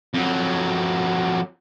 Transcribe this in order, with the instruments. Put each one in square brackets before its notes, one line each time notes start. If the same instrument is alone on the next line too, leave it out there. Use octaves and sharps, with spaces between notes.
[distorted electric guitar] F2 F#3